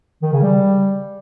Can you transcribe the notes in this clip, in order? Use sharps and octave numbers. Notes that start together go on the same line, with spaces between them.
D#3
C#3
G3